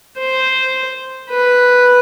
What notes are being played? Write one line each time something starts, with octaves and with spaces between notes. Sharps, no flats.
C5
B4